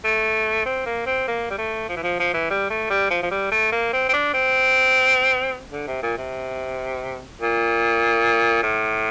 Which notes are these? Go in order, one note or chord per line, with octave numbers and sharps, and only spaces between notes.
A3
C4
A#3
C4
A#3
G3
A3
F3
E3
F3
F3
E3
G3
A3
G3
F3
F3
G3
A3
A#3
C4
C4
D4
C4
D3
C3
A#2
C3
A#2
A2